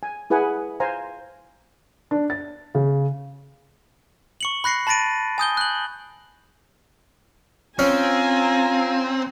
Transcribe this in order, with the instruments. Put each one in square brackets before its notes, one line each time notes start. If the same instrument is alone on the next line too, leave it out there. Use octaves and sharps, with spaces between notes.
[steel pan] G#5
E4 G#4 B4 F#5 G#5
C5 F5 G#5 A#5
[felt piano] D4
A6
C#3
[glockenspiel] C#6 C#7 F#7
B5 F#6 A#6 C7 C#7
A5 B5 A6 A#6 D7 D#7
G#5 D#6 G6 G7
F#6 F#7
[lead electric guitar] C4 [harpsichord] C#4 [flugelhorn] F4 [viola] G#5 A#5